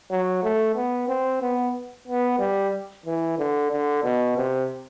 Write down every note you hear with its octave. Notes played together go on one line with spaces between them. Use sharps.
F#3
A3
B3
C4
B3
B3
G3
E3
D3
D3
B2
C3